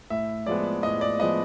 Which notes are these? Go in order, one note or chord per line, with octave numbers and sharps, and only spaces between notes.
A2 E5
F3 G#3 B3 D5
A2 D#5
D5
F3 G#3 B3 D#5